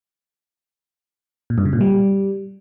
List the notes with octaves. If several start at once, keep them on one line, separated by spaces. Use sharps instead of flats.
A#2
G2
C#3
A#2
G3